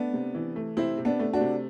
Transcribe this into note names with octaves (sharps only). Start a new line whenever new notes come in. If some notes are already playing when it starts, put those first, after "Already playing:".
Already playing: A3 B3 D4
C3
E3
A3
C3 C4 E4
C3
B3 D4
A3
D4 F#4
C3